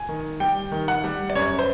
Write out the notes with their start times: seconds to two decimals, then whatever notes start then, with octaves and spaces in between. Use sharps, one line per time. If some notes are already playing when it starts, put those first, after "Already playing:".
Already playing: G#5
0.09 D#3
0.40 G3 G5
0.72 D#3
0.88 F#5
1.04 G3
1.30 D5
1.35 F#2 C#5
1.59 C5